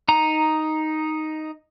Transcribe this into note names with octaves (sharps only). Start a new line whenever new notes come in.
D#4 A#5